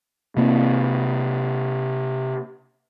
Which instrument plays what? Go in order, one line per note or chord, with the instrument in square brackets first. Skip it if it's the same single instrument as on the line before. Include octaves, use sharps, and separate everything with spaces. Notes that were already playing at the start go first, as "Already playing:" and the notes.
[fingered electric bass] C3 A#3 C4